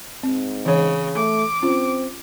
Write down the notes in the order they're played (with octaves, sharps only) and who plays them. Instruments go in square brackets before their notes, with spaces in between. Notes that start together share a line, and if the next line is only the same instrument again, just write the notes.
[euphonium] G#2 [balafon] C4
[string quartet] C#3 [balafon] E3 C#5
[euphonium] A3 [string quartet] D6
[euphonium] C4 [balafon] C#4 F4